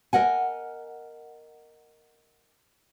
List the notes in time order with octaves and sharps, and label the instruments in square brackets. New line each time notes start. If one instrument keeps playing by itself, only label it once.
[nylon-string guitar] A#4 D#5 F#5 G#5